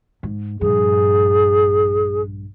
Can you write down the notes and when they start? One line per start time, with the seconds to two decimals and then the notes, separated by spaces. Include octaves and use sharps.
0.23 G#2
0.61 A#1 G2 G#4